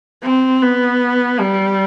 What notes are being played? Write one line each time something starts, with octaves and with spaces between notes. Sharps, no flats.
C4
B3
G3